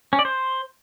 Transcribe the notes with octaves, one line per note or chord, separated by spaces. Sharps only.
C#4
D5
C5